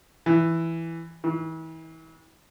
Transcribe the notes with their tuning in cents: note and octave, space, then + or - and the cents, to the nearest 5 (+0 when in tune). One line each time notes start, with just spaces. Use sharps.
E3 +5
E3 -35